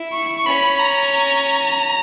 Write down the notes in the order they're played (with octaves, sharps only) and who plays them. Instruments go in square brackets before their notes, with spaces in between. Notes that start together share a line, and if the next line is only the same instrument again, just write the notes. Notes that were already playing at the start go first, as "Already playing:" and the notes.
Already playing: [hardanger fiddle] E4
[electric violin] C#6
[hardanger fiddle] C#4 [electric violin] B5
[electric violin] A#5
A#5